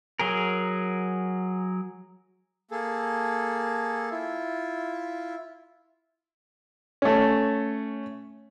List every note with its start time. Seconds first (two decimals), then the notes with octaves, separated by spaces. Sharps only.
0.19 F#3 G#4 A#4
2.71 A#3 G#4 A4
4.11 E4 F4
7.02 A3 C#4